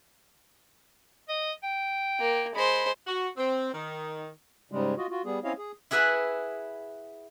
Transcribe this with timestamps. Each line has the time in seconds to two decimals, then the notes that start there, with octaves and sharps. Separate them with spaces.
1.29 D#5
1.63 G5
2.20 A#3
2.55 G#3 C5 B5
3.07 F#4
3.37 C4
3.73 D#3
4.71 G#2 C#3 G3 G#3
4.98 F4 F#4 D#5
5.11 F4 F#4
5.25 G3 B3 G#4
5.44 C4 C#4 E4 C#5 D#5 F5
5.58 G#4
5.91 E4 G#4 B4 E5 F#5